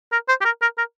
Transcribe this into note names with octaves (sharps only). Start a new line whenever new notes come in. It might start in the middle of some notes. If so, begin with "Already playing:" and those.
A#4
C5
G4
A#4
A#4
A#4